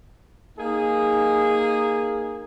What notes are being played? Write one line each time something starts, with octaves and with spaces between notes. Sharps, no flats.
A#3 D#4 G#4